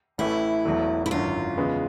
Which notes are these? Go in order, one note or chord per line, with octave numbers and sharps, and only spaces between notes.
A1 A2 E3 A3 E4
E1 E2 B2 F#3 A3
E4
G#1 F#2 D3 F#3 F4
E2 C#3 E3 G#3 B3